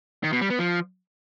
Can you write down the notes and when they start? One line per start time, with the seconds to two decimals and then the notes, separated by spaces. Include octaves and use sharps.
0.24 D#3
0.33 B2
0.41 G3
0.50 B3
0.59 F3